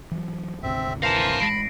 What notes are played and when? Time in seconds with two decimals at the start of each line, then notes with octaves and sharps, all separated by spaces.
0.11 E3 F#3
0.63 G#1 D2 C3 C4 E5
1.02 E3 A#4 C5 F5 A5 A#6
1.40 A1 G#3 B5 A#6 C7 D7